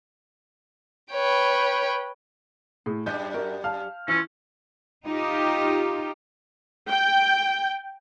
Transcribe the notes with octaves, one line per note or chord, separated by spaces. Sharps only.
B4 C#5 G5
A2 G#4
F#2 G3 E5 G6
F#4 A#4 D#5 E5
F5 A5 F6
E3 C#4 E4 F4
D#4 F4 G4
G5